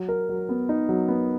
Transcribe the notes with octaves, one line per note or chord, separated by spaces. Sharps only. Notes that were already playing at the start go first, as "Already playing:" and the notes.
Already playing: F#3
A#4
F#3
B3
D#4
F#3
B3